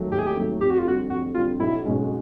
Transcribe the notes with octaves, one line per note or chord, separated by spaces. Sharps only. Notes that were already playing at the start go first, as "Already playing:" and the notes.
Already playing: D#2 D#3 F#3 A3
D#2 G4
G#4
G4
D#3 F#3 A3
F2 G4
F#4
F4
D3 G3 F#4
F2 F#4
D3 G3 F4
B1 E4
B2 G#3 C#4